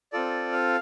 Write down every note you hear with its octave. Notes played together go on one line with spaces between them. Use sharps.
C4 F4 A4 D5
F5